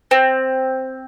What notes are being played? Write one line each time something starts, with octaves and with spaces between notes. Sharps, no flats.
C4